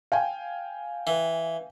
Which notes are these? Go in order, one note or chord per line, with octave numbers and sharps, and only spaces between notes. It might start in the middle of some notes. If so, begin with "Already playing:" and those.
F5 G5 G#5
E3